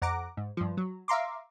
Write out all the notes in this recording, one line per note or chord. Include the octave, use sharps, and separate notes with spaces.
F2 F#5 A#5 D6
G#2
G2 F3
F#3
E5 F5 A#5 C6 D6